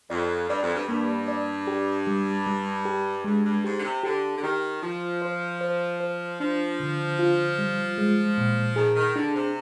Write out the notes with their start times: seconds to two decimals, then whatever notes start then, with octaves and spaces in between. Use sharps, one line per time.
0.10 F2 D5
0.49 G2 D5
0.62 F2
0.74 G2
0.88 G2 A#3
1.28 D5
1.67 G4
2.07 G3
2.47 G3
2.85 G4
3.24 G2 G#3
3.44 G2
3.64 G#2 G4
3.78 D3
3.84 C3
4.03 D3 G4
4.37 D3
4.43 D#3 G4
4.82 F3 F4
5.22 C5
5.61 C5
6.00 C5
6.40 F3 D4
6.80 D3
7.19 F4
7.59 G3
7.98 G#3
8.38 A#2
8.76 D#3 G#4
8.96 D#3
9.16 D3 D4
9.35 C3